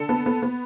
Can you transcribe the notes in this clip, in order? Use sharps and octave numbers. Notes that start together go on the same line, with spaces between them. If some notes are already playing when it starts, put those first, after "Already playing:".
Already playing: D3 A4
B3
B3
B3